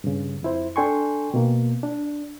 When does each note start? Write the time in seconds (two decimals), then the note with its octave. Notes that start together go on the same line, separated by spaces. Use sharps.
0.04 G2 C#3
0.43 F2 E4 C5
0.76 D4 A4 G5 G#5 C6 C#6
1.34 B2 A#3
1.83 D4